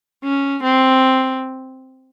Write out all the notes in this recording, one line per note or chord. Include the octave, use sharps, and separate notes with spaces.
C#4
C4